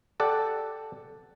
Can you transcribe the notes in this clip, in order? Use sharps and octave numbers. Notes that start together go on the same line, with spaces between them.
G4 A4 D5 F#5